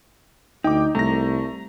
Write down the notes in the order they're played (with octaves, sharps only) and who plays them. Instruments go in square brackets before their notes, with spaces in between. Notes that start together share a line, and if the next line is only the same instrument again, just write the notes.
[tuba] D2 [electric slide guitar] D#4 [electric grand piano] G5 D6
[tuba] C2 [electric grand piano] A3 A#6 [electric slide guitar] A#5